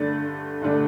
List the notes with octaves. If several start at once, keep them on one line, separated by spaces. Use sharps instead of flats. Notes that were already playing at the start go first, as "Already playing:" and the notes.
Already playing: G2 D3 A3 D4 A6
G2 D3 A3 D4